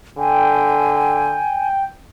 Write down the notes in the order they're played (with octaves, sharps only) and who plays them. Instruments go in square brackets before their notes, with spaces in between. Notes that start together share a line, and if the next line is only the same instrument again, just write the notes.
[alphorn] D3 [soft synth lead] G5 [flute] G#5